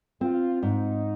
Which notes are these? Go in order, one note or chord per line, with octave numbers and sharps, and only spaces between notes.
C4 F4
G#2 D#4